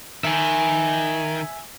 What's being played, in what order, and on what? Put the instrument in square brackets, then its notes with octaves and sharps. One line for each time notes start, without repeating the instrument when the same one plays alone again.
[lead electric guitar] D#3 [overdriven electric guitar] E5 G#5